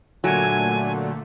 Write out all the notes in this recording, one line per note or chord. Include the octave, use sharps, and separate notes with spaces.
A#2 D3 F#3 A3 G#5